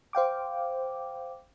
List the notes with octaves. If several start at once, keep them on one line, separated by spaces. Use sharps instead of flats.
C5 F5 G5 D6